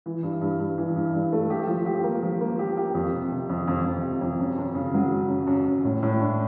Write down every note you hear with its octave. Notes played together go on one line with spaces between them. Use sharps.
E3
G2
G2
G2
E3
G2
G2
A3
G4
F3
G4
A#3
F3
A#3
G4
G4
F2
C3
C3
F2
F2
F2
C3
F2
F#2
F#2
C#3
F#3
C#3
F#2
F#2
F#2
A2
A2
D4